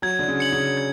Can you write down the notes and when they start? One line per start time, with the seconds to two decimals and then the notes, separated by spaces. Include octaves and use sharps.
0.02 F#3 G#6
0.19 D3
0.28 C#3
0.40 C#7 F#7
0.52 C#3
0.77 G#6